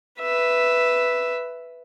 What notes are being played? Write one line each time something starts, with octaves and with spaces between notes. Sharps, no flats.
B4 E5